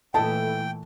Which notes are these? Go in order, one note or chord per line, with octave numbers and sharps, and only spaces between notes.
A#2 E3 A3 E4 A4 D#5 G5 A5